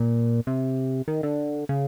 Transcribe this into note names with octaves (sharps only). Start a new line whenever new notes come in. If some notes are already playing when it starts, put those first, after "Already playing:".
Already playing: A#2
C3
D#3
D3
C#3